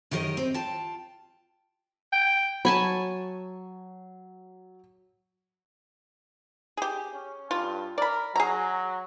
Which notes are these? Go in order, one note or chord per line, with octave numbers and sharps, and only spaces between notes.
F#2 D#3 G4 A#4 C#5 D#5
C4
F4 G5 A5
G5
F#3 C#5 G#5 A5 B5
G4 G#4
C#4
G2 F4
A#4 D5 B5
F#3 G#4 A#5